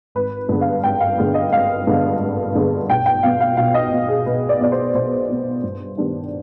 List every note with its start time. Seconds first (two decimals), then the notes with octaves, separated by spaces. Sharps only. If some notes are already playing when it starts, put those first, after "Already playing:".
0.15 G#1 B4
0.49 G2 D3 G#3 B3
0.61 F5
0.84 G#1 G5
1.00 F5
1.18 G2 D3 G#3 B3
1.34 D#5
1.52 G#1 F5
1.87 G2 D3 G#3 B3
2.21 G#1
2.55 G2 D3 G#3 B3
2.89 B1 G5
3.06 G5
3.23 B2 B3 F5
3.40 F5
3.57 B1 F5
3.74 D#5
3.93 B2 B3
4.08 G#4
4.26 B1 B4
4.49 D5
4.60 B2 B3 D5
4.72 C5
4.94 B1 C5
5.29 B2 B3
5.63 G2
5.97 D#3 G3 B3 D4